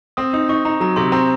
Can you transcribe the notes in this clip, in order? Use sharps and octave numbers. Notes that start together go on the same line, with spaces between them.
C4 D#6
D#4 D#6
D#4 C#6
D#4 A#5
F#3 A#5
C3 C6
C4 A#5